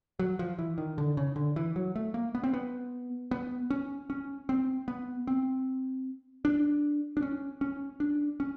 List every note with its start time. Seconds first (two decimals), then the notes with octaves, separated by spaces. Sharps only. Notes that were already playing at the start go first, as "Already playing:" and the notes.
0.19 F#3
0.39 F3
0.59 E3
0.78 D#3
0.98 D3
1.17 C#3
1.36 D3
1.56 E3
1.76 F#3
1.96 A3
2.14 A#3
2.35 B3
2.43 C4
2.54 B3
3.31 B3
3.70 C#4
4.10 C#4
4.49 C4
4.88 B3
5.27 C4
6.45 D4
7.17 D4
7.22 C#4
7.61 C#4
8.00 D4
8.40 C#4